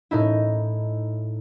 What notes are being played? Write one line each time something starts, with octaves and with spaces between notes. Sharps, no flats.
A2 D#4 E4